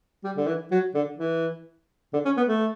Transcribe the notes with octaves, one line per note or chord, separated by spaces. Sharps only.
G3
D3
E3
F#3
D3
E3
D3
C#4
B3
A3